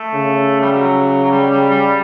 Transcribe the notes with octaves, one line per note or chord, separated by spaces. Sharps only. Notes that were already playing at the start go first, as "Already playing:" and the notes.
Already playing: A3
C#3
G3
F#3
F#3
G3
G3
G3